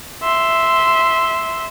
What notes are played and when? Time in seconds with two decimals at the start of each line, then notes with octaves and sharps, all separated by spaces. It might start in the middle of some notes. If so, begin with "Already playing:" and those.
0.23 E5 C6